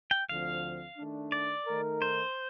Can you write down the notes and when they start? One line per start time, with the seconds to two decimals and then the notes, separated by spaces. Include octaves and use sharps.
0.11 G5
0.29 D2 D3 F3 C4 F5
0.97 D#3 A3 D4
1.32 D5
1.67 D#3 A3 D#4 A#4
2.02 C5